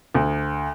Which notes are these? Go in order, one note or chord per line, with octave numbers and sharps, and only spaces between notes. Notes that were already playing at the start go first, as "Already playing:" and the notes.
D2